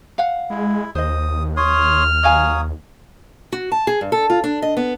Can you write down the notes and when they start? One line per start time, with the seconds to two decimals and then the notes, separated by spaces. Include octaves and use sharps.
0.18 F5 F#5
0.50 G#3 E4
0.95 D#2 C5 D#5 D#6
1.57 C#5 C6 D#6 F6
2.23 F#3 C#5 D#5 F5 G#5 D#6
3.52 F#4
3.72 A5
3.87 G#4
4.01 G2
4.12 A4
4.30 F4
4.44 D4
4.62 D#5
4.77 B3